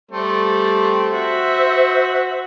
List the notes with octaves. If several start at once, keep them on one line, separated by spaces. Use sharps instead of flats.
G3 A3 C4
F#4 C5 E5